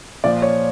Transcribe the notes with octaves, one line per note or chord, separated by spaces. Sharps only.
A#2 F3 D5
C#5